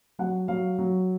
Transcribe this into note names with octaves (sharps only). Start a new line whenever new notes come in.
F#3 F#5
F#3 F5
F#3